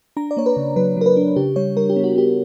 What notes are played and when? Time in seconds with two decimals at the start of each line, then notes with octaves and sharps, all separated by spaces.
0.17 D4 A#5
0.31 D5
0.37 A#3 C#5
0.46 B4
0.57 C#3
0.76 F#3 B4
0.97 F#3 A#4
1.06 B4
1.17 D4
1.36 C#3 G4
1.56 G3 C#5
1.76 G3 A#4
1.90 G4
1.96 B3
2.04 F#4
2.16 B3 G4